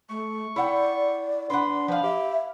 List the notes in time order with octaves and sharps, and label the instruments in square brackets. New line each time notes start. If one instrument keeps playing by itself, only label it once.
[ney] A3 [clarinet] C#6
[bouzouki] E4 F#5 G5 [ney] D5
[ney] D4 [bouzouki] B4 F#5 [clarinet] C6
[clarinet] F3 [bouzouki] B4 F5
[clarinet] G4 [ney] E5